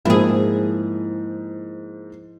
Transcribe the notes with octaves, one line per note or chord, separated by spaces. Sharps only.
G#2 F3 A#3 E4 G#4